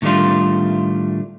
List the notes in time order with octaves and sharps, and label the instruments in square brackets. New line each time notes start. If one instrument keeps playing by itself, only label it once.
[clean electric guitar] A2 D#3 G3 A3 D4 F4